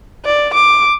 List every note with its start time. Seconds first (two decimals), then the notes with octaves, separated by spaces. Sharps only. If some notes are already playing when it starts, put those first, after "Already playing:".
0.25 D5
0.53 D6